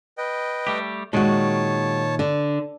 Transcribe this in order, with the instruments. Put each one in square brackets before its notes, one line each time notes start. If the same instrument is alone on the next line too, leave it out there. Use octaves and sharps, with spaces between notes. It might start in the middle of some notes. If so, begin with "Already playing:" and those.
[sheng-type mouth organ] B4 D#5 G5
[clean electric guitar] G3 A3 G4
[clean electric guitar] A#2 D#3 [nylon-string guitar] G#3 F#4 [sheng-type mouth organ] C#5 A5
[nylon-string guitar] D3